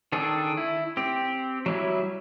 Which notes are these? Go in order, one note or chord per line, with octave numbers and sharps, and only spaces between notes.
D#3 D4 G#4 A4
E4
C4 G4
F#3 G3 E4